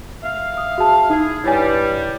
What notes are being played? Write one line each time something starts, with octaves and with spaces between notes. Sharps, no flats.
E5 F5
D#6
F#4 G#4 A5
D#4 E4 G#4
G2 G3 E4 C#5 G#5